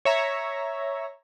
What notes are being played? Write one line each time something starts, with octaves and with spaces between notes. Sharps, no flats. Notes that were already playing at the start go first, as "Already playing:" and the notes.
C#5 E5 A#5